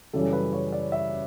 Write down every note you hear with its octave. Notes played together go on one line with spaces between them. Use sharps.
F#2 C#3 E3 G3 C#4 A4
B4
C#5
D5
E5